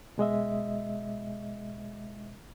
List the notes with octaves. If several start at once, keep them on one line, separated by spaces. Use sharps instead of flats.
B2 G#3 D#5 E5